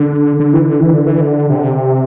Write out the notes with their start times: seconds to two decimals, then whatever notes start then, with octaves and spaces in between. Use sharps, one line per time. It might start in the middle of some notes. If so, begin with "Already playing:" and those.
Already playing: D3
0.40 D3
0.53 E3
0.66 D3
0.80 E3
0.93 D3
1.07 E3
1.21 D3
1.49 C3
1.56 D3
1.64 C3